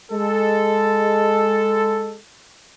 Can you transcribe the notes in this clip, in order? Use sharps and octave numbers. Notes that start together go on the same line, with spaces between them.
G#3 A4